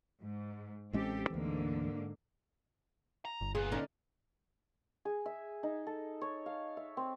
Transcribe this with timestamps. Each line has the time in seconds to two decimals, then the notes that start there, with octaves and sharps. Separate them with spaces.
0.20 G#2
0.93 A1 G#3 C4 C#4 G4 A4
1.30 D2 G#2 D3 E3 A#3
3.25 A#5
3.41 G1
3.55 A#2 B3 G#4
3.72 D3 C#4 D#4
5.05 G#4
5.26 E5
5.63 D#4
5.87 A4
6.21 C#5
6.46 F5
6.77 E5
6.97 C4